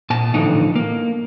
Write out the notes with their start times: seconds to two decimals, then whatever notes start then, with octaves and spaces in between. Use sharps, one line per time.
0.10 A#2 A5
0.34 A2 D3 E3 F3 D#4
0.76 A#3